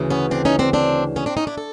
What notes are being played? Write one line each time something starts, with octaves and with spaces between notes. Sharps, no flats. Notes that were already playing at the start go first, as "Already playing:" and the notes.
Already playing: D2 C#3 E3
B3 C#4
C4 D4
C#4 D#4
C4 D4
C4 D4
B3 C#4
C4 D4
C#4 D#4
D4 E4
A4